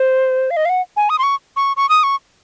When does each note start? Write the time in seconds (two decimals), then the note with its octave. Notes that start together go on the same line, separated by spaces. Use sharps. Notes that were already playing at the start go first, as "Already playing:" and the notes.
Already playing: C5
0.51 F5
0.57 D#5
0.65 F5
0.69 F#5
0.97 G#5
1.10 D#6
1.19 C6
1.23 C#6
1.56 C#6
1.77 C#6
1.89 D#6
2.03 C#6